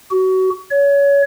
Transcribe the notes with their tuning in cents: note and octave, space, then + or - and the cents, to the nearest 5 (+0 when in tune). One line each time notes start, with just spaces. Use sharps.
F#4 +25
C#5 +25